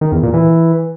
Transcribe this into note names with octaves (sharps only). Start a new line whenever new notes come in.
D#3
E2
A#2
E3